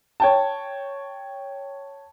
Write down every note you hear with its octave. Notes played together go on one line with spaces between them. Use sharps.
C#5 G5 A5